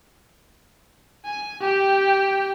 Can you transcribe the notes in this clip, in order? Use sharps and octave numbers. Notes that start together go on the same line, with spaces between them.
G#5
G4 G5